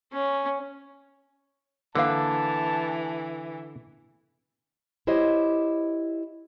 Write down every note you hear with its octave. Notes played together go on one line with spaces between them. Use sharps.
C#4
D3 E3 A#3 B4 F5 A5
E4 G4 C5 C#5 D#5